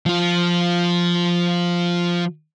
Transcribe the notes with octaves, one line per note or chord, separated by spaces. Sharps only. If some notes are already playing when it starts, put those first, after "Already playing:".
F3 F4